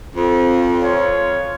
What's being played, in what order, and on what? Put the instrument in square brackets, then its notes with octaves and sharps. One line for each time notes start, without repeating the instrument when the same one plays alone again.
[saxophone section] F2
[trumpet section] F4 C#5